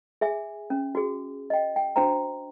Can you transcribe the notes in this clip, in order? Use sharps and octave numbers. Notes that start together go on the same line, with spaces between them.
G#4 E5 G#5
C#4
F#4 G#4
D#5 G5
G5
D4 F#4 C5 G5 A#5